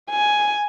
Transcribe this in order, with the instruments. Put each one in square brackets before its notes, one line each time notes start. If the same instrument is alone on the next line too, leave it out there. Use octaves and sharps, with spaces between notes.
[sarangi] G#5